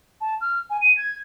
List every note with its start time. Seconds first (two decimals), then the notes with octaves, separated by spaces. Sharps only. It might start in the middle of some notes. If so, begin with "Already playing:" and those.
0.21 A5
0.41 F6
0.70 G#5
0.82 D#7
0.97 G#6